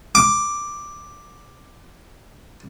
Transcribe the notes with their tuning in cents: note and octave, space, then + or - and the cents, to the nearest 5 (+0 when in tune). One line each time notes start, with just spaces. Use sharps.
D6 +5